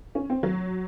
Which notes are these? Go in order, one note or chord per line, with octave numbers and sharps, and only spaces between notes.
C#4
C4
F#3